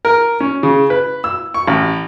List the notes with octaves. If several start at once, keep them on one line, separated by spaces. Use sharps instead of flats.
A#4
C#4
C#3
B4
E6
C#6
A1